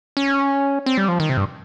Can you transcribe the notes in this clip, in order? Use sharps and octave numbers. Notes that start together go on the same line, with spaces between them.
C#4
C4
G3
F3
D#3
C3
G2